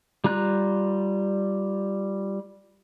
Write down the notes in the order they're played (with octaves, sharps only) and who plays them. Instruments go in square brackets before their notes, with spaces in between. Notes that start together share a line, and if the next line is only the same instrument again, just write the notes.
[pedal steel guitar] G3 F4 A#5 F#6